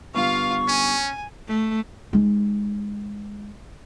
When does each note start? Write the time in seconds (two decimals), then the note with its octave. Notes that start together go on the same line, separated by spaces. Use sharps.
0.14 G2 D3 B3 F4 F5 C#6
0.68 C#4 G#5
1.47 A3
2.13 G#3 D#4